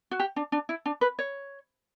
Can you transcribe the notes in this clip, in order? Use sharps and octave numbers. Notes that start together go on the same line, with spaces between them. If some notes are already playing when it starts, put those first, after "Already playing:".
F#4
G4
D4
D4
E4
D4
B4
C#5